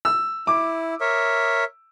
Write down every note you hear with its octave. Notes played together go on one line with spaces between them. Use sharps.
E6
E4 D6
A#4 C#5 E5